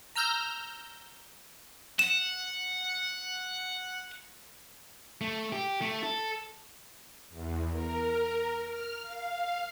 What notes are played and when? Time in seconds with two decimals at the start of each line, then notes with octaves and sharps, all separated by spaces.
0.15 A#5 E6 F6 G6 A#6
1.99 F#5 E7
5.21 A3
5.52 G4
5.81 A3
6.03 A4
7.30 E2
7.71 A#4
8.64 F6
9.03 F5